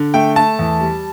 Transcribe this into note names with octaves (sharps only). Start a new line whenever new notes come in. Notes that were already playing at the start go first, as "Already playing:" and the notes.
Already playing: D3
A3 G5
A3 A5
E2
G3